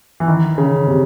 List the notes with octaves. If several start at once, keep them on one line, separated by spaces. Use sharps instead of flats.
E3
D#3
C#3
C3